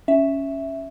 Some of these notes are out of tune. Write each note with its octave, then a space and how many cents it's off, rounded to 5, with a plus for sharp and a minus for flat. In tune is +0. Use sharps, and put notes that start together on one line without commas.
C#4 +0 E5 +0